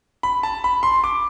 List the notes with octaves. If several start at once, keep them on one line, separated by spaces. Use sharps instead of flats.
B5
A5
B5
C6
D6